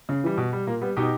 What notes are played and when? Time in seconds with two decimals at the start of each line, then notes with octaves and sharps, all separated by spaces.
0.09 C#3
0.24 E3 G3
0.37 B2
0.53 G3
0.67 A#2 A#3
0.81 G3 B3
0.96 B2 D#4 G4